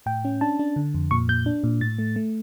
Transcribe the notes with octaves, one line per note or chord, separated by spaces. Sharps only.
A2 G5
C#4
D4 A5
D4
D3
F2
A#2 C#6
A#2 G6
D4
A#2
A2 A6
A3
A3